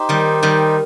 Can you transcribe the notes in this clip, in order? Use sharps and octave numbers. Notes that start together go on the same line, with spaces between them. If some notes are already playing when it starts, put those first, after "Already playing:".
Already playing: D#4 G4 C5
D#3 G3
D#3 G3